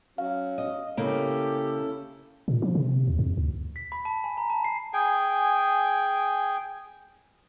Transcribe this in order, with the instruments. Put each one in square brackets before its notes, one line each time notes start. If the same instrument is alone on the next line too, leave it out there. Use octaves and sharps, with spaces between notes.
[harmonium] F#3 C#4 F#4 [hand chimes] F5
[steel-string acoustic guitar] D#5
[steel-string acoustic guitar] C#3 A#3 [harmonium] C#4 E4 A4 [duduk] G4
[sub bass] A#2
F3
C3
D#2
F2
D2
[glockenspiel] B6
B5
A5
G#5
A#5
A5
C7
[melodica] G#4 G5 G#5